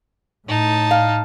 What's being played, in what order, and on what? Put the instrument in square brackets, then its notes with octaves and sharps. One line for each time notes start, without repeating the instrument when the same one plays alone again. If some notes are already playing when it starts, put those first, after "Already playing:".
[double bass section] A2 [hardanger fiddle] D#4 A5
[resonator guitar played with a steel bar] F5